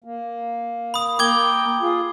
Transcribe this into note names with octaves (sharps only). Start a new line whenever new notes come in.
A#3
B5 D#6
A#3 A#4 G5 D6 G#6 G7
F4 G#4